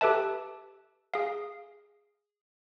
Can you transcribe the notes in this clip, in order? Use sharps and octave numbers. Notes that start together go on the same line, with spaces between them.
G4 A4 B4 E5 A5
G#4 F5